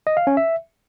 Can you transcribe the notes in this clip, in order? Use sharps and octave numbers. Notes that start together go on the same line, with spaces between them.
D#5
F5
C#4
E5